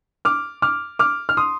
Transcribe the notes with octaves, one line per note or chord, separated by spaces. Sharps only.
D6 F6
D6 F6
D6 F6
F6
C6 D#6